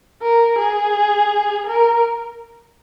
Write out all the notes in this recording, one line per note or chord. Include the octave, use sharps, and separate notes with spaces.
A#4
G#4
A#4